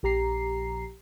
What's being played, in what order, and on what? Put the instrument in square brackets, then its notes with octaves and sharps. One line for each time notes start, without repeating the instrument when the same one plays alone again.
[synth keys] A#1 G4 A#5 C7